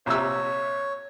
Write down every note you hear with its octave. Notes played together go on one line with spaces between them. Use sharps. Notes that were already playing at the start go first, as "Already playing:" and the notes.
A#1 C3 C#5 E6